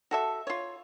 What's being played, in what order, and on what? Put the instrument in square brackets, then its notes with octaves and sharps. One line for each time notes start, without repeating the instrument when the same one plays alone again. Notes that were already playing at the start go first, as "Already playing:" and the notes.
[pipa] F#4 A4 E5
F4 C#5